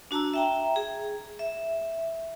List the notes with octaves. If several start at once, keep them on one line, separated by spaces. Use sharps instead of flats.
D4 F#4 A5 A#5 E6
E5 G5 A#5
G#4
E5